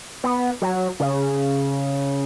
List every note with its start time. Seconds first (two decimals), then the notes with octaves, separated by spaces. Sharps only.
0.24 B3
0.62 F#3
1.00 C#3